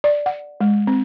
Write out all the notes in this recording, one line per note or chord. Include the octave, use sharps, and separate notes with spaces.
D5
F#5
G#3
C4